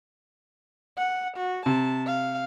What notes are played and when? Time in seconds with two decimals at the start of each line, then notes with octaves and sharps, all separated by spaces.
0.98 F#5
1.37 F#4
1.66 C3 A5
2.06 F5